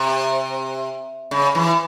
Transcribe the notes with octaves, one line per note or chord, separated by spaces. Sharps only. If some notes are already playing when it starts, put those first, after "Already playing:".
Already playing: C3
C#3
E3